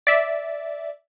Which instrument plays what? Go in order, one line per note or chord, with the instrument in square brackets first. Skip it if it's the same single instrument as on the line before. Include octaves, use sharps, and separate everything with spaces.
[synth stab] D5 E5